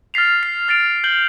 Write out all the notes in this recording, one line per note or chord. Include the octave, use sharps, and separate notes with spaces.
F6 A6 B6 C7 F7
C7
F6 A6 C7 D7 F7
G6 F#7 G7